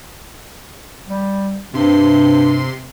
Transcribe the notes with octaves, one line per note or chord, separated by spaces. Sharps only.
G3
G2 C3 C6